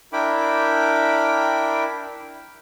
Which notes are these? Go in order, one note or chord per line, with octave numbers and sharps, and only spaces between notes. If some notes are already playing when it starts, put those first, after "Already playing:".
D4 E4 A#4 G5 B5 D6